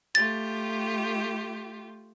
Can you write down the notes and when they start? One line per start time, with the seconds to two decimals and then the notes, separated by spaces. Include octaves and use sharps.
0.15 A3 F4 G4 A6